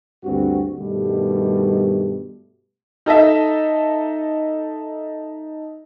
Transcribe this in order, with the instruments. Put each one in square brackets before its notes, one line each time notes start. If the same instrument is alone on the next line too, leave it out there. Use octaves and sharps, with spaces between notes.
[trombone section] D2 G2 C4 F#4
G2 B2 D#3 G3 A3
[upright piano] D#4 A4 D#5 E5